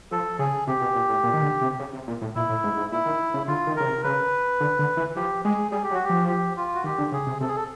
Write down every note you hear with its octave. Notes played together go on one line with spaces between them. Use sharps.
F3 A4
C#3 G#4
C3 G4
B2
A#2
A2
A#2
D#3
D3
C3
C#3
C3
A#2
A2
A#2 E4
A2
G#2
G#2
A#2 E4
D#3
C#3
D3 F4
D#3
C#3 A#4
C3
C#3 B4
D3
D3
E3
F3 G4
G#3 G#4
G3 G#4
G4
F#3
F#4
G4
F3
G4
F4
F#4
D#3 G4
D3
C#3 G#4
C3
C3 A4
G#4
A4